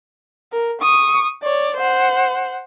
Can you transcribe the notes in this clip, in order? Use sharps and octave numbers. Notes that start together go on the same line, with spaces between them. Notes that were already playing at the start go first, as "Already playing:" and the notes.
A#4
C#6 D#6
C#5 D5
C5 F#5